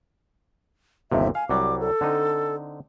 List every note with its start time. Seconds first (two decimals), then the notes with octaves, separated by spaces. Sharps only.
1.12 G1 D#2 C3 E5
1.35 F5 G#5
1.49 C2 F#3 G3 D6
1.80 A4
2.01 D3 C4 D#4